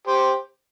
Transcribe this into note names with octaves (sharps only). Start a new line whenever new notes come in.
G4 C5